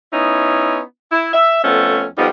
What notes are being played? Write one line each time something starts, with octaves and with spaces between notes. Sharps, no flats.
B3 C#4 D#4 E4
E4
E5
F2 A3 B3 C#4
F2 G3 B3 D#4